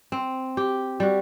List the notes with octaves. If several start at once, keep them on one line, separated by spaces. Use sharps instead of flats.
C4
G4
G3 F#4